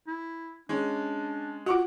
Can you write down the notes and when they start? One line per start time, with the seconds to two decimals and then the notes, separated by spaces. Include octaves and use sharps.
0.07 E4
0.69 G#3 C#4 D4
1.66 F4 F#4 F#5 C#6 D6